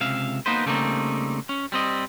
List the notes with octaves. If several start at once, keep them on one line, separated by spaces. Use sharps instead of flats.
C#2 C3 E5 F5
A#3 B3 D#4 B4 C5
C#3 G3 A3 A#3 C4 D#4
C#4
G3 C4 D#5